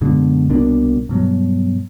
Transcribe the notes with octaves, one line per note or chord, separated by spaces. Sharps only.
F#2 B2 D3 G#3
C2 B2 A#3 D4
G2 B2 F#3